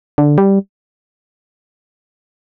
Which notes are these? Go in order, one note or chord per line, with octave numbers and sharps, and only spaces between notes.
D3
G3